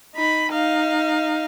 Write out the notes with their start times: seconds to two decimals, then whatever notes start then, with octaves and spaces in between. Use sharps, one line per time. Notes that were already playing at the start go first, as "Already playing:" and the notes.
0.15 D#4 B5
0.50 D#4 F5